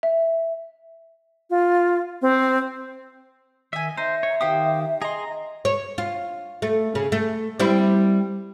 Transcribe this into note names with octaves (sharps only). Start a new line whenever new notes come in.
E5
F4
C4
D#3 D#5 E5 G#5
D#4 C5 E5
C#5
D#3 G4 C5 F5 D#6
G#4 D#5 A#5 C6
C#5
F4
A3
C#3
A3
G3 C4 E4